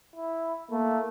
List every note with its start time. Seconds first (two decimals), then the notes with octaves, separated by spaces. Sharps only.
0.15 E4
0.71 A3 A#3